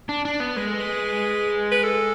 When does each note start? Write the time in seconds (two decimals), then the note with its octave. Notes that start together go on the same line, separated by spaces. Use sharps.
0.09 D4
0.25 D4
0.40 B3
0.56 G#3 B4
0.68 A4
0.80 B4
1.72 B4
1.84 A4